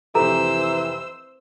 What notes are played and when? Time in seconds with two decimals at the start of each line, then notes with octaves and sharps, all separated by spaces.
0.15 F1 E3 G4 A4 C5 A#5 E6